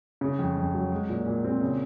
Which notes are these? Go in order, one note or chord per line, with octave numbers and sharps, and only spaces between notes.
C#3
F2
F2
F#3
G#3
A#2
A#2
C4
C#3